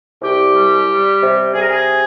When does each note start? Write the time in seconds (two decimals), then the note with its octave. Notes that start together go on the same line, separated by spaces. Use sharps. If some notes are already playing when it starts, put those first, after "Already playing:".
0.21 C2 G4
0.55 G3
0.88 G3
1.21 C3
1.54 C3 G#4
1.61 A#4
1.69 G#4